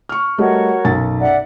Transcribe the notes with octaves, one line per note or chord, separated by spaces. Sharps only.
C#6 F6
G3 A3 F#4 A#4 C#5 D#5
B1 F#2 A6
D5 E5 F#5